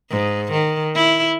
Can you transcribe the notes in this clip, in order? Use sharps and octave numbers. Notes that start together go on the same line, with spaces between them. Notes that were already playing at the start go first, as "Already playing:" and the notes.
G#2
D#3
E4